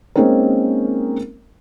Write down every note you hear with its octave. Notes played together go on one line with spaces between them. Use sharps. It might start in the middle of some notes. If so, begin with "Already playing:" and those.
G#3 A#3 C4 C#4 D#4 A#4